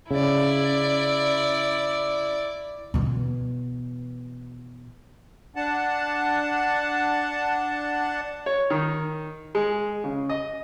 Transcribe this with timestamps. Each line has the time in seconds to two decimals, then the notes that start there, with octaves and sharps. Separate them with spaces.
0.11 C#3 E4 D5
2.94 B2 E3
5.56 D4 F#5 A5
8.46 C#5
8.70 D#3
9.55 G#3
10.04 C#3
10.29 D#5